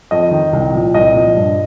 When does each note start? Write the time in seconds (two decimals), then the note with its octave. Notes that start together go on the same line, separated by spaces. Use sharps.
0.11 F2 D#5
0.31 D#3
0.53 C2
0.73 A#2 F3
0.94 C2 D#5
1.15 A#2 F3
1.36 G2